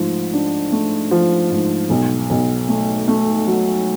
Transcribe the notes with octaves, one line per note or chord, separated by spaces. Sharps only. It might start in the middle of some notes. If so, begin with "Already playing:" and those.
Already playing: G#2 F3 A3
D4
A3
F3
G#2
B1
B1
A3
A3
F#3